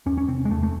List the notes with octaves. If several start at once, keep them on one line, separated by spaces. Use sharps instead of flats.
E2 C#4
C#4
C3 C4
G#3
E2 A3
A3